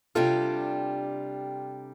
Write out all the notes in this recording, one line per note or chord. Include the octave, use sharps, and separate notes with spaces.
C3 G3 D4 F4 A4